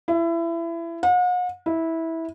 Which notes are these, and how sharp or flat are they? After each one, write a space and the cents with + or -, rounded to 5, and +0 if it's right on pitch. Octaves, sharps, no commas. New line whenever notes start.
E4 +25
F#5 -45
E4 -15